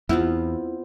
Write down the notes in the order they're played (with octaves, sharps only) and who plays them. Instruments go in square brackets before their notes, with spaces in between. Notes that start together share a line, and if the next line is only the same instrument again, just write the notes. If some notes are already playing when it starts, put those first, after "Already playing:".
[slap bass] E2 [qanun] B3 C4 F4 [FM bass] E4